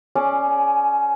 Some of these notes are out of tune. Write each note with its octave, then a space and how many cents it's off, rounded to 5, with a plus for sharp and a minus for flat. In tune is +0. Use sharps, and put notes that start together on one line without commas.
C#4 +0 G#4 +25 D5 +5